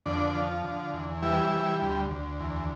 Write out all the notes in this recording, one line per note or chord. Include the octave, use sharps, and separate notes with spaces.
F2 D3 D4
F3
D3
E2
E3 G3 E4
G3
D2
D2
E2